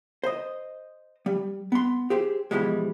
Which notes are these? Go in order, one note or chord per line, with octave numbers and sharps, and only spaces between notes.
C5 D#5
G3
B3 C6
G4 G#4 C5
B2 E3 F3 G3 G#3